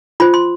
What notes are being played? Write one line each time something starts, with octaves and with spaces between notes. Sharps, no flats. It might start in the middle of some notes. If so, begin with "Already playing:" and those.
F4 C5 B5
C6